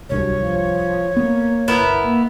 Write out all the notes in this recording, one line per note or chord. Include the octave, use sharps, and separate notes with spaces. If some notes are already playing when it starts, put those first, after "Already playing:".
D1 C2 G2 F#3 C#5
F3
A#3 B3
F#1 B3 E4 A#4
A#3